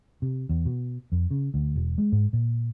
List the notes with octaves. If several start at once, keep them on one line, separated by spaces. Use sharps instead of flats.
C3
E2
B2
F2
C#3
D2
E1
G#3
G#2
A#2